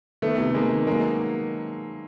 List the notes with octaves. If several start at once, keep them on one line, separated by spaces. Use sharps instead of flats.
D#3 A3 B3
C3
D#3 G#3 A#3
D#3
F#3 G#3 A#3